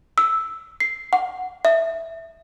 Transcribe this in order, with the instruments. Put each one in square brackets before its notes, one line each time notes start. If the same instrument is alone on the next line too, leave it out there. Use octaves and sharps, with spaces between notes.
[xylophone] E6
C7
F#5
E5